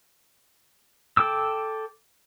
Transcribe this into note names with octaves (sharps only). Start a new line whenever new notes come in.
A4 G5 D6 E6